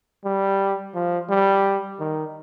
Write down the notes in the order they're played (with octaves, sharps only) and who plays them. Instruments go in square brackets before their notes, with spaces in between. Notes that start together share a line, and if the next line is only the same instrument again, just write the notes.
[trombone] G3
F3
G3
D#3